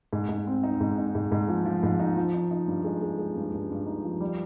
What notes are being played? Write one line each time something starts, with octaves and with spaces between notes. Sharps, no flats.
G#2
G#2
C4
D#4
G#2
D#4
G#2
G#2
F3
F3
G#2
D#4
F3
D#4
D#4
G2
G#3
G#3
G#3
G2
G2
G2
D#4
F3
G3